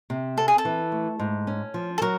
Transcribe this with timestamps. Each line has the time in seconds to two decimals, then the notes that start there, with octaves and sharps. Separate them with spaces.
0.10 C3
0.37 C4 A4
0.48 G#4
0.58 A4
0.65 E3
0.92 A3
1.19 G#2
1.47 C#4
1.74 F3
1.98 A4
2.02 F#3 A#4